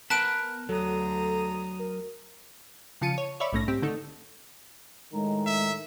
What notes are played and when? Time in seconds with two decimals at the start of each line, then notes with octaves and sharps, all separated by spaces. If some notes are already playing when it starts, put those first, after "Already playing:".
0.10 B3 A#4 F#5 A5 B5 F#6 D7
0.69 D2 F#3 A4 A#5 D#6
1.79 A#4
3.01 C#3 F3 F4 A5 C#7 D#7
3.18 C#5
3.40 C#5 D5 E5 B5 C#6
3.53 B1 A2 A3 C#4 A#6
3.68 G#2 C4 G4
3.82 D3 A3 D#4 A4
5.13 A2 D#3 G#3 A#5
5.46 E5